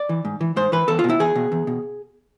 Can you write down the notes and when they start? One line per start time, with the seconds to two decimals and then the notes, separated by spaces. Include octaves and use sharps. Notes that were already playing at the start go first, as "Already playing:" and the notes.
Already playing: D5
0.09 E3
0.25 G#2
0.41 E3
0.56 G#2 C5
0.72 E3 B4
0.88 E2 A4
0.99 F4
1.04 B2
1.10 E4
1.19 E2 G#4
1.35 B2
1.52 E2
1.67 B2